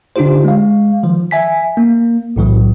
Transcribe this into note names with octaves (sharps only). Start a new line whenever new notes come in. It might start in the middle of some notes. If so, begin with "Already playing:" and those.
D3 D4 D#4 F4 G4 C5
G#3 F5
D#3 F3
E5 G#5 B6
A#3
B1 A2 E3 F#3